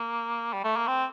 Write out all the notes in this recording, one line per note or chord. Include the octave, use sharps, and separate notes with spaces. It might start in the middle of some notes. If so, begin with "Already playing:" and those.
Already playing: A#3
G3
A3
A#3
C4